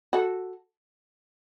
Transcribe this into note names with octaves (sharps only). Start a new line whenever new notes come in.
F#4 A4